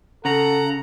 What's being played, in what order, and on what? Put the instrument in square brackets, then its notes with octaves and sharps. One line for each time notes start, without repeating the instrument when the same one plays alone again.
[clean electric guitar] C#3 [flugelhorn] A4 [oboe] F#5 [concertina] A#5